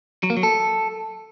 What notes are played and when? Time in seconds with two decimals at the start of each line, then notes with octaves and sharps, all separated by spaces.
0.23 F#3
0.30 A#3
0.37 F#3
0.43 A4